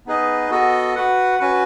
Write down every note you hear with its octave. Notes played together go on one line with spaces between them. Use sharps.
B3 D#4 G#4 B4 D#5
B3 F#4 A4 D#5
F#4 B4 F#5
C#4 F#4 B4